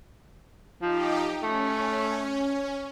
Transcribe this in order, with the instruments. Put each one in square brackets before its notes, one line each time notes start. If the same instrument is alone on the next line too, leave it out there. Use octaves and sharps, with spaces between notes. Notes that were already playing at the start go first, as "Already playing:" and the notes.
[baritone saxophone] F3 [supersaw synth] D#4 G4
[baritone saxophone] A3 [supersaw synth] C#4